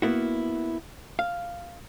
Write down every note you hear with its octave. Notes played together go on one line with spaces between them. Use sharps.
A#3 B3 E4 F#4
F5